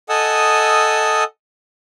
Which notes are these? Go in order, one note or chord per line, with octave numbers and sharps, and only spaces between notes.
A4 D#5 F#5 G#5 D#6 E6